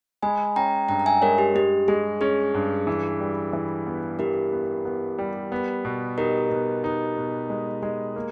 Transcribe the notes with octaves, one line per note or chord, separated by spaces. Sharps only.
G#3 G#5 B5
C#4 G5 A#5
G2 G5 A#5
A#5
E5 G#5
G#3 A#4 C#5
G4
G#3 G4
G#3 G#4
C#4 G#4
G2
E3
G3
E3
B3
E3 G4 A#4
B3
B3
G3
B3
B2
D#4 G4 A#4
B2
D#4
B2
G#3
G#3
A#3